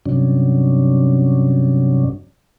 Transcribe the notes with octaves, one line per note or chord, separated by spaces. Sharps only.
G2 C3 F#3 C#4 D4